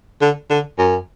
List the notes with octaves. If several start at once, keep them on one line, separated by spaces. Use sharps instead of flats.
D3
D3
F#2